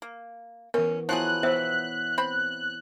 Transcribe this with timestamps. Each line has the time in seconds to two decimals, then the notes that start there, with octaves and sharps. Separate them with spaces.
0.02 A#3
0.74 E3 B3 C#4 A#4
1.09 F3 F#3 B3 E4 G#4 C#5 F#6
1.43 B3 C5 E5
2.18 C4 B5